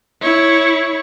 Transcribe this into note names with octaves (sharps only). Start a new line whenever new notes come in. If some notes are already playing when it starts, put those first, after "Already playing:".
E4 C#5